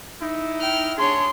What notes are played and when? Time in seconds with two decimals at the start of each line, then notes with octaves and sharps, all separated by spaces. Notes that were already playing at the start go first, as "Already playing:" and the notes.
0.22 D#4 E4
0.59 G5 F6
0.98 D4 G#4 C#5 C6